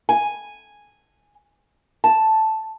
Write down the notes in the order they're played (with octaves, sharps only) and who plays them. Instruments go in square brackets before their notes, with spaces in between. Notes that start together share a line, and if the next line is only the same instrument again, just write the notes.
[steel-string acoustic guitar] G#5
A5